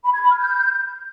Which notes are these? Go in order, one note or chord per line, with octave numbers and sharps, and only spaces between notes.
B5
G#6
B5
F6
G6